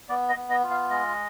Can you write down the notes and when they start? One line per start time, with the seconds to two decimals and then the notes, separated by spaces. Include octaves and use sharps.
0.09 B3 D5
0.29 D#5
0.36 B3
0.50 D#5
0.64 F4
0.70 F5
0.90 G#3 D#5